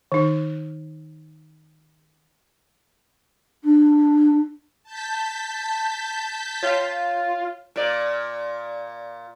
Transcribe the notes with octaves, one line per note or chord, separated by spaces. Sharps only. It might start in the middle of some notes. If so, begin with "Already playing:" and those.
D#3 D#4
D4
A5 G6 B6
F4 C#5 E5 G5
A#2 D5